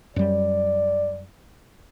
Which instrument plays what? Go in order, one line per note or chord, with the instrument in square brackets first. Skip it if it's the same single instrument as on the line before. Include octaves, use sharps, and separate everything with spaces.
[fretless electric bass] F#2 G3 [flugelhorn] D5